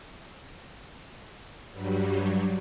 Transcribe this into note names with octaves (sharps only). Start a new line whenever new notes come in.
G2 F#3 G3